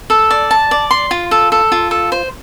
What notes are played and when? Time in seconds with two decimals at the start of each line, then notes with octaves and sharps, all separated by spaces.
0.10 A4
0.31 D5
0.51 A5
0.71 D5
0.91 C6
1.11 F4
1.31 A4
1.52 A4
1.72 F4
1.91 A4
2.12 C5